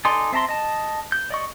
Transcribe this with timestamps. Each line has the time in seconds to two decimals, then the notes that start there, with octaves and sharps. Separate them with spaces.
0.05 D#4 A4 D5 G#5 C6
0.32 C4 E5 A5 A#5 C6
0.49 D#5 A5
1.12 G6
1.30 D5 D#5 C#6